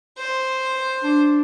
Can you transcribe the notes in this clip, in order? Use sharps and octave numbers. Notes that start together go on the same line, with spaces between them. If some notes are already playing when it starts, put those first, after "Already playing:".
C5
D4